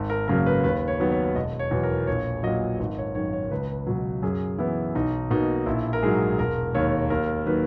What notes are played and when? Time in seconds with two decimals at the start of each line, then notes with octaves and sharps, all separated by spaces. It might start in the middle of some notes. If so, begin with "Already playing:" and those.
Already playing: G#1
0.10 A#4
0.28 F#2 C#3 F#3 A#3 A#4
0.46 B4
0.63 D#2 B4
0.88 C#5
1.00 D#3 F#3 B3
1.12 C#5
1.36 E1 D#5
1.59 C#5
1.71 E2 B2 F#3
1.83 A#4
2.07 A#1 C#5
2.43 A#2 F#3 D#5
2.79 G#1 D#5
2.98 C#5
3.15 F#2 D#3 C#5
3.33 C#5
3.51 C#2 B4
3.87 B2 F#3
4.22 F#2 G#4
4.58 E3 B3 E4
4.95 B1 D#4
5.31 B2 A#3 D#4
5.66 A#1 E4
5.93 A#4
6.03 G#2 F#3 G#4
6.38 E1 A#4
6.75 D#2 D#3 C#5
7.10 D#2 A#4
7.46 D#3 F#3 A#3 B4